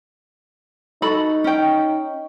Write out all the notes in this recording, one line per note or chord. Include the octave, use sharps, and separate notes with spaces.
D#4 F#4 A4 B5
C#4 G5